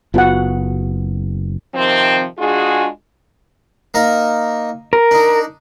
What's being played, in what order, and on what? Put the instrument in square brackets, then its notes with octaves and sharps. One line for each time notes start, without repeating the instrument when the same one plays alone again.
[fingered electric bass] F#1 B3 [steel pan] F4 F#4 F#5
[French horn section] C3 D#3 F3 C4
G#3 D4 F4 F#4 G#4
[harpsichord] A#3 D#4 A#4
[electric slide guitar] A#4
[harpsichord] D4 D#4